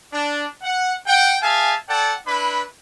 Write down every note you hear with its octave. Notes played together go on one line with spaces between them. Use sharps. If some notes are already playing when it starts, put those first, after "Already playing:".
D4
F#5
F#5 G5
G#4 E5 F5 G#5 A5
A4 D5 F#5 G5 A5
D4 E4 B4 B5